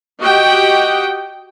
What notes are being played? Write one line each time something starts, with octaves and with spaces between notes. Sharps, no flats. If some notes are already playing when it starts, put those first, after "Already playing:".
F#4 G4 D#5 F#5 G5